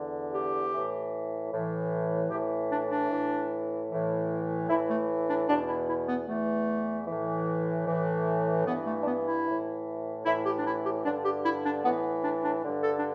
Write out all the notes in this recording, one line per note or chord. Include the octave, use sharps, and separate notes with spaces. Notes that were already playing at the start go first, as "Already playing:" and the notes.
Already playing: E2 D3
G4
A2 E3
A2 E3
A2 E3 G4
D4
D4
A2 E3
A2 E3
A2 E3 E4
A3
D4
E2 B2 D4
E4
E4
B3
E2 E3 A3
A2 E3
A2 E3
G2 E3 B3
A3
D4
B3
E4
A2 E3
A2 E3 E4
G4
D4
E4
G4
G2 D3 D4
G4
E4
D4
A2 E3 B3
D4
D4
G2 D3
A4
D4